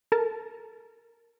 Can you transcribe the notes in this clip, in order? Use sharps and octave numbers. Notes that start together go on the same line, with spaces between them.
A4 A#4 A5